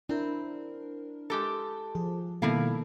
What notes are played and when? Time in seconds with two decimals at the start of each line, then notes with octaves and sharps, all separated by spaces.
0.09 C4 D4 E4 A#4
1.30 G#3 G4 A4
1.95 F3 G#4
2.42 B2 D#3 G3 A#3 E4 A4 F5